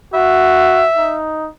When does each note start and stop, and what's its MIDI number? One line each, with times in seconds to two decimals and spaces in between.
0.14 0.86 66
0.14 1.16 76
0.97 1.49 63